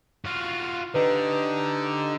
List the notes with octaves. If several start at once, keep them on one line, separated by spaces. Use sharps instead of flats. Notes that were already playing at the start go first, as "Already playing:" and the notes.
F4 F#4 F5
D3 D#4 G4 B4